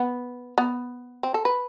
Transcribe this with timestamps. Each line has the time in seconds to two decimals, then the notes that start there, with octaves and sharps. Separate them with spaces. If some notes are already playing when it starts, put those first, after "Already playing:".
Already playing: B3
0.58 B3
1.23 C4
1.34 A4
1.45 B4